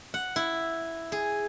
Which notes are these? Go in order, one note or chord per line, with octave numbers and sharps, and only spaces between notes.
F#5
E4
G#4